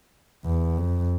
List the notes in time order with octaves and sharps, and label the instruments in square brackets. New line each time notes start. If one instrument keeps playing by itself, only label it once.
[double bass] E2
F2